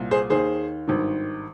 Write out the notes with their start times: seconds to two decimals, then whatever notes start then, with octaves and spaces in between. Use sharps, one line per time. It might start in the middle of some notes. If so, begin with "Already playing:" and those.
Already playing: C2 A#2
0.11 G#4 C5
0.30 D#2 D#3 G#4 C5
0.88 G#1 G2 D#3